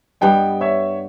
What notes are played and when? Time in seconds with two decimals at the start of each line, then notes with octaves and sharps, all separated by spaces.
0.21 G2 G3 B3 D#5 G5
0.61 C#5 E5